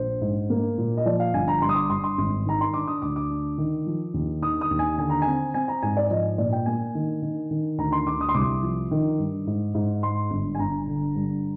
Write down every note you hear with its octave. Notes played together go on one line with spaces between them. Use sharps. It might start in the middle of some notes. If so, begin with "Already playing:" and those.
Already playing: A#1 C5
G#2
A#3
A#2
D#5
F3 D5
F5
G1 G#5
A#5
G2 C6
D#6
D6
G2 C6
C6
G#1
D#3 A#5
C6
D4 D6
D#6
D2 D6
D6
D4
D#3
F3
D#2
D#3 D#6
D#6
D#2
G#5
D3 G#5
A#5
C4 G#5
C4 G#5
A#5
G#2 G#5
D5
F3 D#5
A#2 D5
G5
A#3 G#5
D#3
D#3
D#3
D2 A#5
C6
D2 D6
D#6
C6
C2 D6
F3
D#3
G2
G#2
G#2
G#3 C6
G1
G#5
G1 A#5
D3
G2